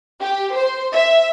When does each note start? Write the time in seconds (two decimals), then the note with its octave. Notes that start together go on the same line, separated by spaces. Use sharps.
0.20 G4
0.54 C5
0.94 E5